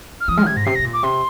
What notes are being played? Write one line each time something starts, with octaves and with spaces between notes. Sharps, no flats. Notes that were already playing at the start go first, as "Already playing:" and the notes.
F6
F3 D#6
G#3 F6
C3 G#6
G#2 A#6
C3 C7
C3 A#6
A#2
D6
C3 C6